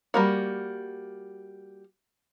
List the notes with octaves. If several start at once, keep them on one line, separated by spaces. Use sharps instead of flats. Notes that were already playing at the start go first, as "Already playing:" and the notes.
G3 A#3 F#4